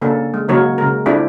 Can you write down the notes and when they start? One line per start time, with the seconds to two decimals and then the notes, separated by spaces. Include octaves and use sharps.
0.02 C#3 A#3 C#4 D4 A4
0.34 G#3
0.48 C#3 F#3 A#3 D#4 A#4 C#5
0.78 C#3 G#3 A#4
1.06 A3 C4 D4 E4 F4 G4